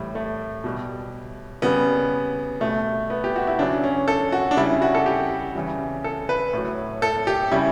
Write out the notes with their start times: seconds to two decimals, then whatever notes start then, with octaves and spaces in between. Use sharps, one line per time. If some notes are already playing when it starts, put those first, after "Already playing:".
Already playing: A2 E3 G3
0.15 A3
0.64 B2 G3
1.62 C#3 G3 B3
2.60 B2 G3 A3
3.10 B3
3.24 G4
3.36 F#4
3.47 E4
3.59 C#3 D4
3.62 F#3
3.84 C#4
4.08 A4
4.32 F#4
4.51 D4
4.57 C#3 G3 E4
4.82 F#4
4.95 A4
5.06 G4
5.55 C#3 E3 G3
6.04 A4
6.29 B4
6.53 A2 F#3
7.02 A4
7.27 G4
7.51 C#3 G3 E4